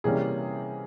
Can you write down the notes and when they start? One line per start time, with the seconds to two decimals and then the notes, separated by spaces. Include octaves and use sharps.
0.04 C3 E3 G3 A#3 C#4 G#4